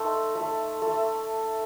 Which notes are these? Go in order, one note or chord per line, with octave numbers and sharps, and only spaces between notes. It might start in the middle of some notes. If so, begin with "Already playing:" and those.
Already playing: A3 D#4 C5 D#5
A3
A3